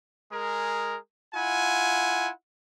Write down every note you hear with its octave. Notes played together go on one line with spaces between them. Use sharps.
G#3 G#4 A#4
E4 F4 F#5 G#5